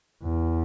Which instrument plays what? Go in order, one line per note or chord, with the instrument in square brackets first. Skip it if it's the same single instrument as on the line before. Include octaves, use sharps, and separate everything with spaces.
[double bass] E2